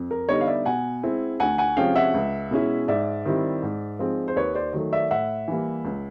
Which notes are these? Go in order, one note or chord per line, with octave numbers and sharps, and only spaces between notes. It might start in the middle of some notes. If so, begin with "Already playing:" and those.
Already playing: F2
A#4
D3 G3 B3 D#4 C#5 D#5
F5
D5 E5
B2 F#5 G#5
G#3 C4 E4
D2 F#5 G#5
F#5 G#5
C3 F3 G#3 C#4 F5 G5
E5 F#5
C#2
B2 G#3 C#4 E4
G#2 D5 E5
D#3 G3 C4 E4
G#2
F3 G#3 C4 D#4
C5
D#2 B4 C#5
C5 D5
D#3 F#3 A3
D5 E5
A2 E5 F#5
E3 G3 A#3
C#2